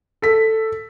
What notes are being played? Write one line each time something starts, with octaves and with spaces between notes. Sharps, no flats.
A4 B6